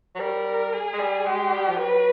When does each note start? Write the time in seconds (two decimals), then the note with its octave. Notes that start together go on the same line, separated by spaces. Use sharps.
0.15 F#3
0.20 G3 A#4
0.73 G#4
0.93 G#3
1.00 G3
1.26 G#3 G4
1.53 G3
1.68 F3
1.79 F#3 B4